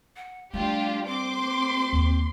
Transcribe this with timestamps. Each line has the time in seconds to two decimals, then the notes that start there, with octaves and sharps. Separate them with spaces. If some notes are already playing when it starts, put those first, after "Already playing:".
0.16 F#5
0.54 G3 A3 D4 F4 G4
1.06 C4 C5 C6 D6
1.93 D#2